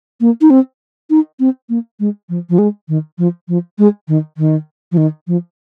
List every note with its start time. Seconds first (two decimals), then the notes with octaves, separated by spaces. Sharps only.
0.21 A#3
0.41 D#4
0.50 C4
1.10 D#4
1.40 C4
1.69 A#3
2.00 G#3
2.29 F3
2.50 F3
2.58 G#3
2.89 D#3
3.18 F3
3.48 F3
3.78 G#3
4.08 D#3
4.38 D#3
4.92 F3
4.97 D#3
5.27 F3